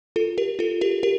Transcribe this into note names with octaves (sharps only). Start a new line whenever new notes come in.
F4 A4
G4 A#4
F4 A4
G4 A#4
G4 A#4